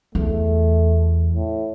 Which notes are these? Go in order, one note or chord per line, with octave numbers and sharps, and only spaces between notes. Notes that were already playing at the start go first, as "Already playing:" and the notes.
E2 A3
A2